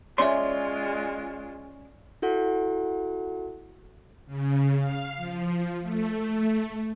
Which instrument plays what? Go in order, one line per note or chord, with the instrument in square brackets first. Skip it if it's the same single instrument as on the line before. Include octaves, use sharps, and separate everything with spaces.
[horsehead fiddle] G#3 F4 [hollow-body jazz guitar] C#4 D5 C6 [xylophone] C#5 E5
[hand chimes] E4 F#4 A4 F#5
[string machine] C#3
F5
F3
A3